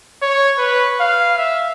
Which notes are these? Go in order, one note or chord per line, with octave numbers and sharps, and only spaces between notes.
C#5
B4
F5
E5